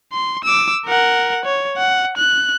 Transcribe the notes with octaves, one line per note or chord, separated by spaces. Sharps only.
C6
D6 E6
A#4 F#5
C#5
F#5
F#6